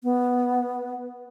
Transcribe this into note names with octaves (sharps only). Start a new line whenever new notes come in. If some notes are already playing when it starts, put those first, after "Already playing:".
B3